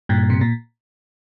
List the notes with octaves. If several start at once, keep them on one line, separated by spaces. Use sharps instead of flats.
G2 A#2
C3
A#2